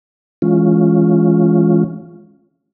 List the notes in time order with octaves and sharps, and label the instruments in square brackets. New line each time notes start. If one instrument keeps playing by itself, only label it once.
[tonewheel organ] E3 G#3 C#4 F4